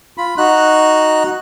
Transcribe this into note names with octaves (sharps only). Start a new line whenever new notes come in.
F4 B5
D#4 F#4 F#6